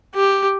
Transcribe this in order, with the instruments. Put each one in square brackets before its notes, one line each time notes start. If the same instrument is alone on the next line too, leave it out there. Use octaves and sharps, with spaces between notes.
[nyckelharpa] G4